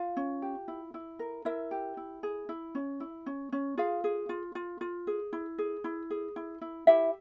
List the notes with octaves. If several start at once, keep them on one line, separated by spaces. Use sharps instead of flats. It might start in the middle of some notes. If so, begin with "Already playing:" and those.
Already playing: F4 F5
C#4
G4
E4
E4
A#4
E4 A#4 E5
G4
E4
G#4
E4
C#4
E4
C#4
C#4
F4 G#4 F5
G#4
F4
F4
F4
G#4
E4
G#4
E4
G#4
E4
E4
E4 G4 E5